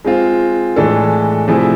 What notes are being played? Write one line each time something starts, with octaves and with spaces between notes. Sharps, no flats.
G#3 C4 F4
A2 E3 G#3 D4 A4
C3 F3 A3 E4 G#4